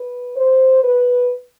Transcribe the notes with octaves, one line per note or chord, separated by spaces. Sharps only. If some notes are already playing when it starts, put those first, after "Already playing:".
Already playing: B4
C5
B4